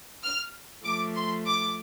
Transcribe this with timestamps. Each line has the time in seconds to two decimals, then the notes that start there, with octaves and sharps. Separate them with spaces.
0.24 F6
0.84 F3 A3 D6
1.15 C6
1.46 D6